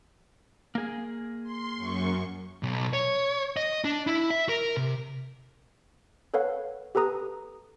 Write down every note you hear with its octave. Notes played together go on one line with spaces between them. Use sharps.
A#3 G#4
C6
F#2 C#6
B1
C#5
D#5
D4
E4
E5
A#4
C3
A4 B4 C#5 F5 F#5
G4 A4 B4 A#5 D#6